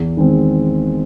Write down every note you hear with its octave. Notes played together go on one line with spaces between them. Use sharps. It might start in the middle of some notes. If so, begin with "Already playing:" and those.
Already playing: E2
D#3 G#3 C4